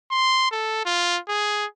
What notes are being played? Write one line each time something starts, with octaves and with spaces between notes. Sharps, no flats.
C6
A4
F4
G#4